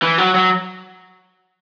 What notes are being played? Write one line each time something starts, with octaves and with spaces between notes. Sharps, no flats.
E3
F#3
F#3